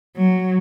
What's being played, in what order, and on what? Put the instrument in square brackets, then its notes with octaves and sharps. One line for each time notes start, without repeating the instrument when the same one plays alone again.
[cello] F#3